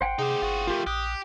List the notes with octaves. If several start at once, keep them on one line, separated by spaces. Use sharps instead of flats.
G#1 C5 F#5 G5
C3 D#4 G4 G#4
G1 F4 F#4
F3 A3 F4 G4 A#4
A#1 G4 D#6 F#6